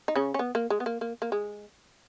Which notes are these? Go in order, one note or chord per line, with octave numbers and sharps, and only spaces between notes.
D#4
C#3 C#4
C#4
B3
A#3
G#3
B3
A#3
A#3
A#3
G#3